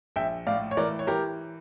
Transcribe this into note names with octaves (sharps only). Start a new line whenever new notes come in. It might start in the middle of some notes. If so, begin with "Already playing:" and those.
A#1 E5 G5
A2 D5 F5
C#5
E3 A#4 D5
C#5
E3 G4 A#4